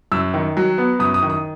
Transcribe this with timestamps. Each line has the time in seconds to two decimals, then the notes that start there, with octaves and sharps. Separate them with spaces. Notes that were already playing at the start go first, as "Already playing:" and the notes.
0.12 F#2 E6
0.34 D#3
0.57 F#3
0.78 B3
0.99 F#2 D#6
1.14 D#6
1.23 D#3
1.30 D#6